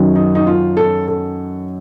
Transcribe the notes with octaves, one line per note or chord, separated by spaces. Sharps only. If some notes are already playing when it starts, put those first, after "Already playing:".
Already playing: F#2 D#3 F#3
D#4
D#4
F4
A4
A4